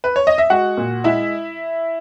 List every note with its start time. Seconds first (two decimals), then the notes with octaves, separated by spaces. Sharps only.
0.04 B4
0.16 C#5
0.27 D#5
0.38 E5
0.50 G#3 F#4 F#5
0.77 A#2
1.04 G#3 E4 E5